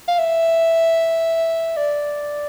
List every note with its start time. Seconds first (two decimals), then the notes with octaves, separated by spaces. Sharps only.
0.08 F5
0.19 E5
1.77 D5